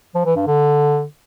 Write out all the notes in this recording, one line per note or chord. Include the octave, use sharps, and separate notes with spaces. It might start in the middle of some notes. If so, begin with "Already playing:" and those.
F3
E3
G2
D3